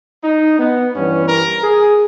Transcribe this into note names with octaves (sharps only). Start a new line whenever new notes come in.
D#4
B3
G2 E3 C#4
A#4
G#4